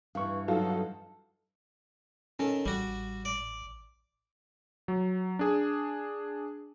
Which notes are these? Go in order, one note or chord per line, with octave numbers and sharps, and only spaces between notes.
G2 E3 F5 C#6
F#3 D#4 F4 F#4 A4
D#3 C#4 A4
A1 G3 F#4
D5
F#3
D4 G#4